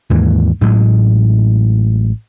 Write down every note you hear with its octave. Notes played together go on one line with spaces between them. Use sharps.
D#2 G#2 E3 A#3
A1 A2 F#3 G#3